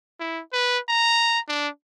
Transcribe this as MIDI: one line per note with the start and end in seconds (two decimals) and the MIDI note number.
0.20 0.41 64
0.53 0.78 71
0.89 1.40 82
1.48 1.68 62